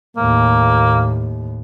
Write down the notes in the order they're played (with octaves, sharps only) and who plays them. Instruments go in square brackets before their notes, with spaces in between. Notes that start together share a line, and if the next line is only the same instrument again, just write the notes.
[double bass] D#2 A2 [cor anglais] A#3